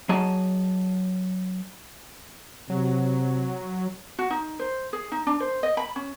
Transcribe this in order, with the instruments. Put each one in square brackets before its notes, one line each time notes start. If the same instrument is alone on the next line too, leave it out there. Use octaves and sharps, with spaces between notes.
[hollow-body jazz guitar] F#3 G#4 D#5 A5
[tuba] C3 [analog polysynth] F#3
[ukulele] F#4
D#4
C5
G#4
D#4
D4
C5
D#5
B5
C#4